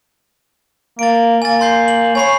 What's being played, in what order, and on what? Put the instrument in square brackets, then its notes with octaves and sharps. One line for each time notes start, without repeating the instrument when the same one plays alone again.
[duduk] A#3 [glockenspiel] A6 D7
[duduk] A#3 [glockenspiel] G#5 A6
[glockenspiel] C6 G6 C7
F#7
[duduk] C#5 [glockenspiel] G#5 B5 C7